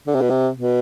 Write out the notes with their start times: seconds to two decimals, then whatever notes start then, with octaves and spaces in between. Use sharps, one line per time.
0.07 D3
0.15 C3
0.21 B2
0.30 C3
0.57 B2